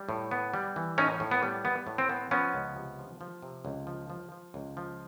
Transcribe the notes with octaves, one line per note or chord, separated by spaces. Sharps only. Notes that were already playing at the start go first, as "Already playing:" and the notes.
Already playing: G3
A2
B3
G3
E3
A2 C#4 D#4
A2
B3
G3
B3
A2
C4
B3
F3 B3 C#4
C#2
C3
F3
F3
C3
C#2
F3
F3
F3
C#2
F3